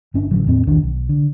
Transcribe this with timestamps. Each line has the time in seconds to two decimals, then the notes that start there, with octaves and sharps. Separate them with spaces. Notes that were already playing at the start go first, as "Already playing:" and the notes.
0.14 G1 C#4 D4
0.31 A1 D3 F#3
0.47 E2 A2 C4
0.67 B1 E2 D#3 D4
0.83 B1
1.09 D3